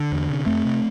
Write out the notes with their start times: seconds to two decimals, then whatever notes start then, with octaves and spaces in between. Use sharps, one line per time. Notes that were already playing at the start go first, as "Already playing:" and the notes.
Already playing: D3
0.12 E2
0.30 C3
0.46 F2 A3 C4
0.65 C3